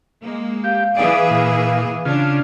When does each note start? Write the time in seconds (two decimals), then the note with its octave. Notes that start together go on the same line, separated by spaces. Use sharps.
0.20 G#3 A#3
0.64 G4 F5
0.97 E3 G#4 D5
1.31 A#2
2.05 C#3 D4 F4